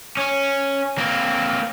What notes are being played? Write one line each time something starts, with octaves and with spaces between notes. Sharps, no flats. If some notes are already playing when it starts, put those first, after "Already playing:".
C#4
A#3 C4